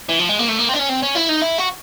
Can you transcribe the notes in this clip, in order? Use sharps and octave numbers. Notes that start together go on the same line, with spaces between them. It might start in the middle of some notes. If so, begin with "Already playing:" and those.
E3
F3
G#3
A#3
A3
A#3
C4
D4
C#4
C4
C#4
E4
D#4
E4
F#4